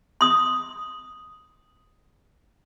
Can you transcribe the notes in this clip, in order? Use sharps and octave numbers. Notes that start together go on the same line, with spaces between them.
C6 D#6